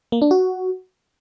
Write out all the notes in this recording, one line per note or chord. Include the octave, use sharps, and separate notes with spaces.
A#3
D4
F#4